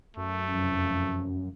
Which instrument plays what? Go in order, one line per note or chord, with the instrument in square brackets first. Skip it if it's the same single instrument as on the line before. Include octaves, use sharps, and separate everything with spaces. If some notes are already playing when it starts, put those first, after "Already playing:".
[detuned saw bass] F#2 [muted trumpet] A3
[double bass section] F1 F3 F#3 [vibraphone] C#4